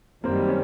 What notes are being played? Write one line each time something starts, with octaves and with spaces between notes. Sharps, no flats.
F#2 D#3 G3 A#3 C4
C#4